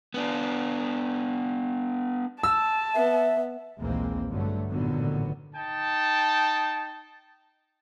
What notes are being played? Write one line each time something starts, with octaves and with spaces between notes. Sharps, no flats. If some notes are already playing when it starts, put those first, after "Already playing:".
B3 D4
A5 E6
B3 E5
A#1 D#2 E3 G#3 A#3 C4
G2 D3 F#3 A3
A1 A#2 D3 D#3 F#3 B3
D#4 G5 A5